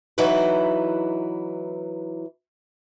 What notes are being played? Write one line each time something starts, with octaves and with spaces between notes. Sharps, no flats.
E3 F#3 D#4 E4 B4